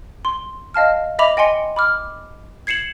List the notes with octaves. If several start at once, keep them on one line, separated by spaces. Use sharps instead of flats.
C6
D#5 F5 A5 F6
D#5 E5 B5 D6 F7
D#5 G5 G#5 C6 C#7
B5 D6 F6
G#6 C7 C#7 E7 F#7